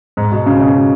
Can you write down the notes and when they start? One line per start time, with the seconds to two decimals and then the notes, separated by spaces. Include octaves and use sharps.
0.17 G#2
0.32 B2
0.46 C#3
0.60 B2